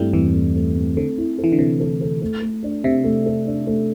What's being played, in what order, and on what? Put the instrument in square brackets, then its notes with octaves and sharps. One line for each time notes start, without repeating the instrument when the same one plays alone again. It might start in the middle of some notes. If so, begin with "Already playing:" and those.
Already playing: [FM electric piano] G2 G3 A3 [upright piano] C4 E4
[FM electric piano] E2 E3 [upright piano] C4
[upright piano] A3
A3
C4
[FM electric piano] D3 [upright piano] A4
[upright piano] E4
A4
[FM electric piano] E3
D3
[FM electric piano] C3 [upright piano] A4
[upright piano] A4
A4
A3
A3
D4
[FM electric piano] C3 [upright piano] E5
[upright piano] A3
A4
D4
A3